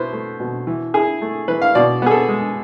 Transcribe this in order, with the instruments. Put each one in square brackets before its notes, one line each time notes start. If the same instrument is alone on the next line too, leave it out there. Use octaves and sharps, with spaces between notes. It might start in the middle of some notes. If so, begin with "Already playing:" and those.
Already playing: [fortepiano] B2 E4 B4 C5
A3
B2
E3
E4 G#4
A3
E3 B4
F5
B2 D5
B3 G#4
A4
G#3